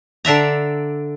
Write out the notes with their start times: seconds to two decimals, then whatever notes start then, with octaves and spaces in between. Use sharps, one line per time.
0.25 D3 D4 E5 A#5